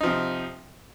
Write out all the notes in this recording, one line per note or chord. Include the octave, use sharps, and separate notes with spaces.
C3 F3 D#4